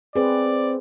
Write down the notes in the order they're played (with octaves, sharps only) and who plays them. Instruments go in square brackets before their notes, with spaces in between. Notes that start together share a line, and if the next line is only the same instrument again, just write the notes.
[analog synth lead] C4 [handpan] G#4 B4 [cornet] D5